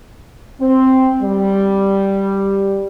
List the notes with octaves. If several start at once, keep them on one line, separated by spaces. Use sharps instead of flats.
C4
G3